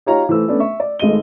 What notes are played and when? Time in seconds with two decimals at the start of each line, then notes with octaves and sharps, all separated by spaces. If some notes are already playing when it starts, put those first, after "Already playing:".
0.06 D#4 F4 G4 C#5 F5 A#5
0.29 E3 A3 C5 E6
0.48 A3 B3 C#4 D4
0.60 E5 C#6
0.80 D5
0.99 G#1 G#3 A3 D#5 D#7 G7